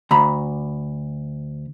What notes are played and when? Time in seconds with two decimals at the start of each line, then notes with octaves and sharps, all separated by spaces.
0.11 D2 A#5 B5